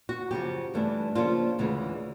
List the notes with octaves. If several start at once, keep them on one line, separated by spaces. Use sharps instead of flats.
F#4
F#2 C#3 F3 G4
G2 E3 A3 D4
C#3 F3 A#3 D4 F4
D2 C#3 E3 G#3